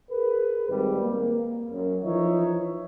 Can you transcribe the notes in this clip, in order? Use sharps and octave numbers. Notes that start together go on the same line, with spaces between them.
G#4 A#4 B4
G#1 G3
A#3
F#2
E3 F3 D#4 C#5 E5